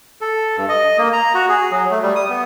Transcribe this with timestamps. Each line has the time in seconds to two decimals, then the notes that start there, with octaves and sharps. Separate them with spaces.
0.21 A4
0.57 G2
0.69 D#5
0.98 A#3
1.13 A#5
1.35 F#4
1.49 G#4
1.72 F#3
1.91 A3
2.03 G3
2.16 D#6
2.29 B3